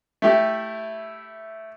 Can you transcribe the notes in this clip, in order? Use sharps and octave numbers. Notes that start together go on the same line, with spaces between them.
A3 E4 G4